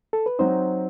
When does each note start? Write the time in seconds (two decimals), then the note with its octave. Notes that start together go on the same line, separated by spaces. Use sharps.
0.13 A4
0.26 B4
0.39 F#3 C4 D#4 C5